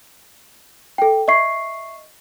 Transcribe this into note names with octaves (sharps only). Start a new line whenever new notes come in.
A4 G5
D#5 E5 C#6 C7